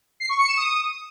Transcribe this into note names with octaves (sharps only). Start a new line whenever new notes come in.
C7
C#6
C#7
E7
D#6